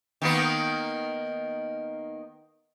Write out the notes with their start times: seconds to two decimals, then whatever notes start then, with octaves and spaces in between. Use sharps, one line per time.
0.22 D#3 A#3 B3